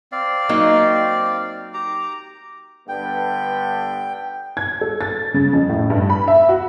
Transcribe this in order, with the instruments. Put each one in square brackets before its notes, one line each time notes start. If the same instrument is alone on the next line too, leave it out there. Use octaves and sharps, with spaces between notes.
[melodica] C4 D5 F5
[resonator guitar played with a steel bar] F#3 A#3 D#4
[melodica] G4 A#5 D6
[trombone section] G2 D3 B3 [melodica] G5
[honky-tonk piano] G#6
A4
A6
C#3
F2
A2
G2
B5
E5
F#4